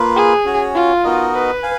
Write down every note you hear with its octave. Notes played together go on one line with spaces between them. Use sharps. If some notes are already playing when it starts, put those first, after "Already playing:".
Already playing: A#3 F4 B4
G#4
C#4 F#4 C#5
F4
B3 D#4 F#4 A#4 D#5
B4
F5 G#5